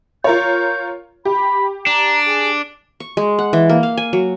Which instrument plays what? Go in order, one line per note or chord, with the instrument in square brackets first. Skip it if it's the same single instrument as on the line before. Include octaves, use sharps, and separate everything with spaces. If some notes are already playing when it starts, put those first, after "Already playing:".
[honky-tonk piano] F4 A#4 C#5 [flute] G6
[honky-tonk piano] G4 [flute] B5
[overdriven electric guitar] D4 [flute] A#5
[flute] G#4
[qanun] C#6
G#3
F#5
E3
A#3
F5
G#5
F#3